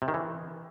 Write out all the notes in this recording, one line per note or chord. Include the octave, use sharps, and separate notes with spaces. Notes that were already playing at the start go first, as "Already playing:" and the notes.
C3
D#3
E3